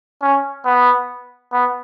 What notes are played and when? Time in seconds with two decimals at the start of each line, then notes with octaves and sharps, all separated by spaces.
0.22 C#4
0.65 B3
1.52 B3